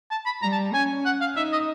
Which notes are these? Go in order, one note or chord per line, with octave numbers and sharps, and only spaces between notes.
A5
B5
G3 A#5
A5
C#4 G#5
F#5
F5
D#4 E5
D#5